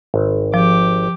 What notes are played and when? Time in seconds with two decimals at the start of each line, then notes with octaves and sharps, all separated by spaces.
0.14 G#1
0.54 F3 G4 D6